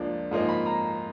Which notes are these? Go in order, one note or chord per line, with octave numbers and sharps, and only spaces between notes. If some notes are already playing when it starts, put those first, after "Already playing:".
Already playing: C#2 F3 A#3 D4
G#2 F3 A#3 D#4
B5
A#5